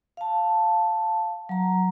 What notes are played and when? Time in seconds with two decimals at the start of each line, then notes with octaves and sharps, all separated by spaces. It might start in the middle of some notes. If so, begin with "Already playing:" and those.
0.17 F5 A5
1.49 F#3 A#5